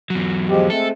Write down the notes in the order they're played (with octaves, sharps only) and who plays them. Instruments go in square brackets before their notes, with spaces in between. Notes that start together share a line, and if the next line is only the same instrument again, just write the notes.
[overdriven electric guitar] E2 F#3
[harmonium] F3 G#3 G4
[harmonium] G#3 A3 C4 [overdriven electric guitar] A4